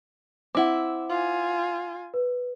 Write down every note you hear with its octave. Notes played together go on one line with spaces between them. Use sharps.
C4 E4 F#5 D6
F4 G#5
B4